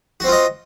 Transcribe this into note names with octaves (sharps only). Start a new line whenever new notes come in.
C4 F4 F#4 D#5